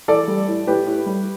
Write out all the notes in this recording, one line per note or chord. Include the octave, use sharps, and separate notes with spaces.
E3 A4 D5
G3
A2
A2 G4 B4
A2
G3